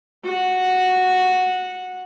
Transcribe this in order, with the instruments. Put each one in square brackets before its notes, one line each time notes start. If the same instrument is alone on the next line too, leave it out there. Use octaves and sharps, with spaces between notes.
[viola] F#4 F#5